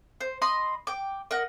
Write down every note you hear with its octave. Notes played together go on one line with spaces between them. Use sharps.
C5
D#5 B5 C6 D#6
G5 D6
A#4 D#5 F#5